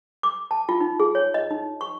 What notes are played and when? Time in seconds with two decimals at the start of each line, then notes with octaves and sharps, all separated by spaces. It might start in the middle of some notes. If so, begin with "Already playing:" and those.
0.23 D6
0.51 A5
0.69 F4
0.81 D#4
1.00 G#4
1.15 C#5
1.34 D#5
1.51 D#4
1.81 C#6